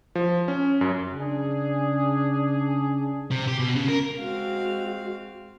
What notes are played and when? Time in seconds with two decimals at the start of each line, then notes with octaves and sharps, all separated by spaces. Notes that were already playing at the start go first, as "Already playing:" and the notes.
0.15 F3
0.48 C#4
0.81 F#2
1.13 C#3 D4 G#4
3.31 C3
3.48 G4
3.59 B2
3.75 C#3
3.88 A#4
4.18 G#3 C4 F#4 F5